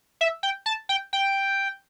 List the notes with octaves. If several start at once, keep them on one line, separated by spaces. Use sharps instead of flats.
E5
G5
A5
G5
G5